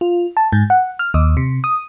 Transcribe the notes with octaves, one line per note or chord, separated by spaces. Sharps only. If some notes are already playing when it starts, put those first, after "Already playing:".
F4
A5
G#2
F#5
F6
D#2
C3
D#6